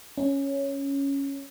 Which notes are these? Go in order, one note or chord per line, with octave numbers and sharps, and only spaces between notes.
C#4